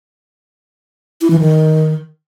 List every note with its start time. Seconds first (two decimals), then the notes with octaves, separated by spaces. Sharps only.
1.21 E4
1.30 E3
1.40 D#3